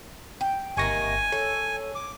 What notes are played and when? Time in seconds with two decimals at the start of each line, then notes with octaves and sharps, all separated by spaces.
0.41 G5
0.77 G1 C3 D#3 A#3 G#5 C#6 A#6
1.32 A4 C#5
1.95 D6